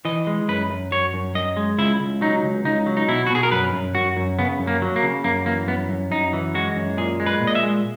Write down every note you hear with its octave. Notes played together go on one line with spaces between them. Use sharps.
E3 D#5
G#3
F#2 B4
F#2
F#2 C#5
F#2
F#2 D#5
G#3
C#2 E4
C#2
F#3 D#4
C#2
C#2 D#4
F#3
D#4
B2 E4
F#4
B2 G#4
A#4
F#2 B4
F#2
F#2 F#4
F#2
C#3 B3
F#2
A#3
F#3
A#3
C#3
F#2 A#3
E3 A#3
F#2 B3
F#2
F#2 D#4
E3
G#3 F#4
F#2
A#2 G#4
G#3
B4
A#2
D#5
E5
G#3